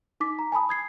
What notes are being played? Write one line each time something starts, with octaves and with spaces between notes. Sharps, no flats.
D#4 D6 B6
A#5
G#5 A5 B5 D#6
D#6 G#6 C7